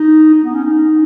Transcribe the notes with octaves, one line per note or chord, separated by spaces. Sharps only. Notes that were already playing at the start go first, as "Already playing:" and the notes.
Already playing: D#4
D#4
B3
C#4
D#4